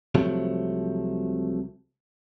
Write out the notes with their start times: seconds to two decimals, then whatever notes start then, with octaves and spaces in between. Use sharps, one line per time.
0.15 C2 C3 F3 F#3 A3